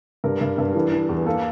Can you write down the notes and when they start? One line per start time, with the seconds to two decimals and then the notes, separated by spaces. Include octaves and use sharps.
0.24 G2 A#4
0.41 G2
0.58 G2
0.75 E3 A4
0.92 E3
1.09 E2
1.26 A#3 A4